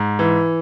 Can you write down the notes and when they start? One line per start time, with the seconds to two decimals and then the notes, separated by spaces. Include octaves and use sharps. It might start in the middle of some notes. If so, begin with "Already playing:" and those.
Already playing: G#2
0.19 E3